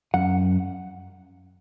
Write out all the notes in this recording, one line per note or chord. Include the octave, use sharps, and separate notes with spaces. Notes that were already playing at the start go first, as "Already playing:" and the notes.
F#2 F#5